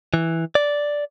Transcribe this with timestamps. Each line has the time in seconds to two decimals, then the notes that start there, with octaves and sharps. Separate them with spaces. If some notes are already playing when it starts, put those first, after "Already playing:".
0.14 E3
0.55 D5